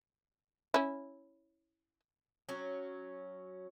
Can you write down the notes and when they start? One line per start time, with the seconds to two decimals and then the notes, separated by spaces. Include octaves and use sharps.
0.74 C#4 E4
2.49 F#3 C#4